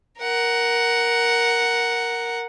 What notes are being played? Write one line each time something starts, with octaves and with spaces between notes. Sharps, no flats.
A#4 F#5